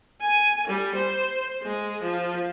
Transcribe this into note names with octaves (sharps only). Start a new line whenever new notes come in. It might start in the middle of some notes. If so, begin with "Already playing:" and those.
G#5
G3
C5
G#3
F3